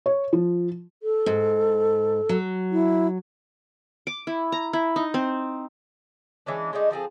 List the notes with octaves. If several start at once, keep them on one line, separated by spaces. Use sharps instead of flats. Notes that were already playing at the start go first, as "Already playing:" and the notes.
C#5
F3
A4
G#2
F#3
E4
D6
E4
A#5
E4
D#4
C4
E3 G#3 C#4 D4
G#3 A3 D4 D#4
F3 C4 G#4 A4